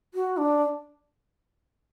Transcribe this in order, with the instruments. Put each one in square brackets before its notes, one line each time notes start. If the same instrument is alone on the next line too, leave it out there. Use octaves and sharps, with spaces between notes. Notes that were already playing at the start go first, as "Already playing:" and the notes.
[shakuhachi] F#4
D4